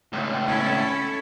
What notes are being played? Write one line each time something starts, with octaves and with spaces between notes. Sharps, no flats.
C#2 A2
C#4 E4 A4